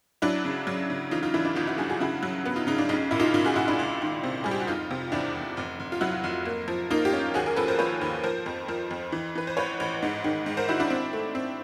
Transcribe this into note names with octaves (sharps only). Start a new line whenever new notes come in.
F#3 D4 E4
C#3
F#3
C#3
E3 D#4 F4
D#4 F4
E3 D4 E4
D4 E4
G1 D#4 F4
E4 F#4
G2 F#4 G#4
F#4 G#4
C#3 E4 F#4
F#3
B3
D#4 F4
C#3 D#4
D4
B1 D#4
A#2 E4
D#4 F4
A#2 D#4 F4
F#4 G#4
A#2 E4 F#4
D4 E4
C#2
D#3
C3
G3 G#4
G4
F#4
F1 D#4 F4
C3
E2 D4 E4
E2
F1
F1
F4
F#3 E4 F#4
F1
A#3
F3
A#3 D#4 F4
F4 G4
C#4
D#2 F#4 G#4
G#4 A#4
F3 A4 B4
A#4 C5
F3 B4 C#5
D#2
F3 A#4 C5
F2
F3 A#4 C5
F2
E3
E3 B4
C5
A1 B4 C#5
A1
G#2
D#3
G#2
A#4 C5
D#3 E4 F#4
D4 E4
C4
A3
C4